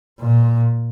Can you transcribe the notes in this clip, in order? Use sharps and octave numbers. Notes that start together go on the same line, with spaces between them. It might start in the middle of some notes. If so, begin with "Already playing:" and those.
A#2